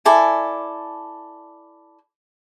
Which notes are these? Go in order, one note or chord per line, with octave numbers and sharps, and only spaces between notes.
E4 A4 D5 G#5